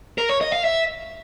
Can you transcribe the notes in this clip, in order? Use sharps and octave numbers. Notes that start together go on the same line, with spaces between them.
A#4
C#5
D#5
F5
E5